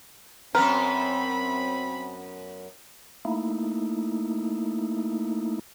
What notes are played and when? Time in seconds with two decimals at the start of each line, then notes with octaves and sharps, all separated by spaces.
0.55 F#2 B3 C4 A#4 B4 B5
3.25 A3 A#3 D#4 E4